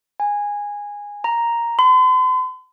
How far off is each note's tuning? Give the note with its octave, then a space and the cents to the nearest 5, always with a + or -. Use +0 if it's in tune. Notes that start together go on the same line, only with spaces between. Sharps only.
G#5 -15
A#5 +5
C6 -45